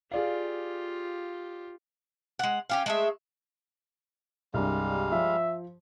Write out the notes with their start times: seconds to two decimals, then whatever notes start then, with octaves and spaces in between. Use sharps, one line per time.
0.12 F4 G4 G#4 D5 F5
2.39 G#3 F#5
2.70 C#4 G4 F5
2.86 G#3 A3 E5
4.54 C2 G2 G3 G#3 F5
5.12 F3 E5